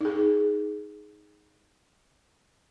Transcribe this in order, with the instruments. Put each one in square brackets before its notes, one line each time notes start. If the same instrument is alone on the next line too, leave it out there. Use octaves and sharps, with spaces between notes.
[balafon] D#4 G#4